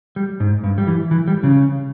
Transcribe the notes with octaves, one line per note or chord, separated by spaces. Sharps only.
G3
G#2
G2
G3
E3
E3
G3
C#3